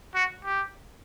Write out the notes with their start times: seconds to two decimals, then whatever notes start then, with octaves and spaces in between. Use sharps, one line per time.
0.15 F#4
0.45 G4